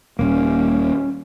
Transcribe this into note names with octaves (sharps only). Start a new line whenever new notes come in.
D#1 A#2 G3 A#3 C#4